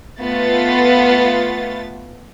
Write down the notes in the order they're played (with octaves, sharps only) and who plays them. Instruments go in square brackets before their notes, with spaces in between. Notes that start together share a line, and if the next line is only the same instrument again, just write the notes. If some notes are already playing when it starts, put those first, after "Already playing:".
[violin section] A3 B3 F4 B4 A6